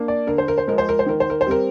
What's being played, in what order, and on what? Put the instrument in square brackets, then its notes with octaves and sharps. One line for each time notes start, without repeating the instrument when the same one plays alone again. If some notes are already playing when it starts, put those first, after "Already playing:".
Already playing: [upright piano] A#3 D4
D5
D3 A#4
C5
A#4
C5
F3 G#3 A#4
C5
A#4
C5
D#3 A#4
C5
A#4
C5
G3 C4 A#4